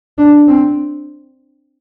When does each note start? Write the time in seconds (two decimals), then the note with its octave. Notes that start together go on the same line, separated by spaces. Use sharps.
0.18 D4
0.48 C4